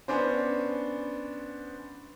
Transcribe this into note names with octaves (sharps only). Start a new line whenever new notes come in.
B3 C#4 D4 C5